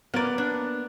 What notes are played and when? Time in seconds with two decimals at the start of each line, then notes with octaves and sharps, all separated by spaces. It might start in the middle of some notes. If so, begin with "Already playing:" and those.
0.14 A#3 B3 D5
0.38 D4